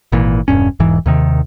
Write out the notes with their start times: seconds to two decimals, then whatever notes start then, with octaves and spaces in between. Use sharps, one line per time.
0.12 G#1 A#2 E3
0.48 E1 G2 C#4
0.80 E1 G#2 E3
1.06 D#2 C3 D#3